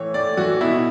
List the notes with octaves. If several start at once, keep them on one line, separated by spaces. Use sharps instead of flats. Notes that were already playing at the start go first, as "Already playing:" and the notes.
Already playing: A2 E3 C#5
A2 D5
E3 F#4
B2 E4